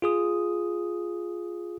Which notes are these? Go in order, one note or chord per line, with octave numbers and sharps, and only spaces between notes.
F4 G#4 D#6